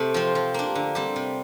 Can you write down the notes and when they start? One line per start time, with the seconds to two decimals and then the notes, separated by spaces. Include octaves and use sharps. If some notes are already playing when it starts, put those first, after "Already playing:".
Already playing: C3 A3
0.14 F3 C4
0.35 F3
0.54 A#3 D4
0.75 D3
0.95 G3 C4 G4
1.16 C3